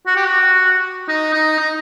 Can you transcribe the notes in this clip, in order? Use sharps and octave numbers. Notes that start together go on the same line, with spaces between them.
F#4
G4
F#4
D#4
D#4
D#4